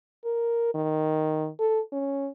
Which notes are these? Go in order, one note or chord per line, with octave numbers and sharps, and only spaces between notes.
A#4
D#3
A4
C#4